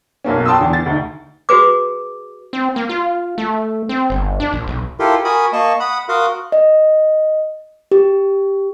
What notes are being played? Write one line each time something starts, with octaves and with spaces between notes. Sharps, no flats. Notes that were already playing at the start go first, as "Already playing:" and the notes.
B1 F#2 A#3 C#4
G5 A5 C6 D#6 E6
E2 D3
A6
D2 D#4
F#4 G#4 B4 D6
C4
A#3
F4
A3
C4
G1
D4
A#1
B1
E4 F4 G4 A4 A#4 C6
F#4 A#4 G#5 B5 D#6
A#3 D#5 A5 C#6
F#5 B5 D#6
F#4 A#4 F5 C6 D#6 F#6
D#5
G4